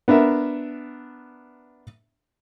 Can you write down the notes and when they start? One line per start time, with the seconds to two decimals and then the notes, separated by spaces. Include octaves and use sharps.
0.08 B3 D4 A#4 E5